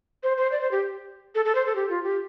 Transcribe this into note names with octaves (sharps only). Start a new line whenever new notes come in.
C5
C5
D5
C5
G4
A4
A4
C5
A4
G4
F4
G4